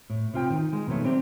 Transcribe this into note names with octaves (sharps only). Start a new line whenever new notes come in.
A2
C3 F4 G5
D#3
G#3
B2 D#3 F#3 A3
C4 D4 G4